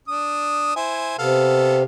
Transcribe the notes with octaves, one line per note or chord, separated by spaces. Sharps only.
D4 D#6
E4 C5 G#5
C3 B3 A4 F5